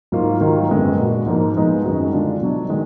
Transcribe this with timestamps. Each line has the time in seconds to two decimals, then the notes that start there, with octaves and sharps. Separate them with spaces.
0.12 G#2 F#3 A#3 F4
0.40 G#2 D#3 F#3 A#3 F4
0.69 F#2 D3 G#3 B3
0.99 A#2 G#3 D4 F#4
1.26 G#2 F3 A#3
1.55 F3 G#3 B3 D#4
1.84 F#2 D#3 G#3 D#4 F#4
2.13 D3 G#3 D4 F4
2.41 B2 F#3 D4
2.69 D#3 G#3